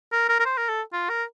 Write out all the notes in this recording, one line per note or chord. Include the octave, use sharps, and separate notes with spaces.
A#4
A#4
A#4
C5
A#4
A4
F4
A#4